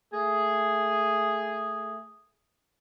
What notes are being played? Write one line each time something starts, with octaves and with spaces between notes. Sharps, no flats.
A3 G#4